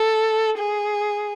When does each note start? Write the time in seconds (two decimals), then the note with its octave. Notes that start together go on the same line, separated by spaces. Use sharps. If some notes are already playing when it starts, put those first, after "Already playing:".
Already playing: A4
0.58 G#4